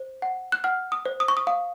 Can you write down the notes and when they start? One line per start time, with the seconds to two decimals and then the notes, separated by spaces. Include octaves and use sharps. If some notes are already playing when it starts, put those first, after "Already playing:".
Already playing: C5
0.22 F#5
0.52 F#6
0.64 F#5 F6
0.92 D#6
1.06 C5
1.20 D#6
1.28 C#6
1.37 D#6
1.47 F5 D#6